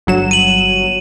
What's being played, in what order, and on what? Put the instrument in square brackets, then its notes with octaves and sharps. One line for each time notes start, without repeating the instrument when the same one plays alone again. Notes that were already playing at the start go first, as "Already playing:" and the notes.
[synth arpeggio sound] G1 F#3 E7
[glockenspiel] D#7 F#7